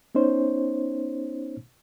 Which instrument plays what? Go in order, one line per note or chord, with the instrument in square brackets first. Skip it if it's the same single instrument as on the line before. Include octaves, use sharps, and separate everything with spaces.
[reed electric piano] B3 C#4 D#4 C5 C#5